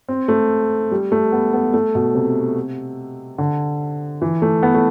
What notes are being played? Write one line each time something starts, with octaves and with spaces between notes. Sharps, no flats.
C4
A3
G3
A3
B3
B3
A3
B2
C3
D3
E3
A3
B3
A3